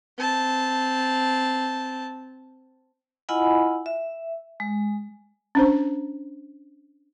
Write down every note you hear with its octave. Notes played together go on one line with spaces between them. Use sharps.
C4 A5
E4 F4 D#5 F#5 G#5 B5
E5
G#3
C#4 D4 C5